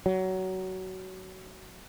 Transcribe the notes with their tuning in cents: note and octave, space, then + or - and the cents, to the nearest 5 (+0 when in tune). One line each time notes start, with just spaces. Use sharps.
F#3 +20